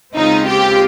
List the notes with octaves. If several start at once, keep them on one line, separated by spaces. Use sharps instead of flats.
D#2 C#3 G#3 C4 D#4 F4
G4